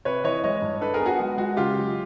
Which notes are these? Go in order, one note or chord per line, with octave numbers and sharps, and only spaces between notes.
C3 B4 C#5
E3 C#5 D#5
G#3 C#5 D#5
G2
D4 A4 B4
G#4 A#4
B3
F#4 G#4
G#3 F#4
G#3 F#4
C#3 F4 G4
F#3